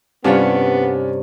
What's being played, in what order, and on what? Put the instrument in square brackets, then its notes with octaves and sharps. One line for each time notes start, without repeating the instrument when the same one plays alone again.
[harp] G2 C3 C#5 [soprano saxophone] B3 [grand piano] C#4 D4 F4